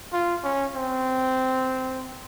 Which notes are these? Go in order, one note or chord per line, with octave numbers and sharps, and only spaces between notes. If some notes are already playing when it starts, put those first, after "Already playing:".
F4
C#4
C4